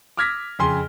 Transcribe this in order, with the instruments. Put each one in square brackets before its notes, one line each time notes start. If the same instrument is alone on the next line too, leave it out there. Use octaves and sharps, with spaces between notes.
[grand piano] D6 E6 F6 G#6 A#6 B6
F2 C#3 G#5 C6 G7